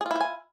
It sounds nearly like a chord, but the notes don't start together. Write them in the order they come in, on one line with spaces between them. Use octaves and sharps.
G#4 F4 E4 C5 G#5